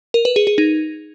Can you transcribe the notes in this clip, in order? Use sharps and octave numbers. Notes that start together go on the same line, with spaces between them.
A#4
B4
G#4
G#4
D#4